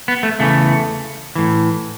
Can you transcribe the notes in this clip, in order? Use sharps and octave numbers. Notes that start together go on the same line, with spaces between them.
B3
A3
E2 C#3 E3 A3
A2 E3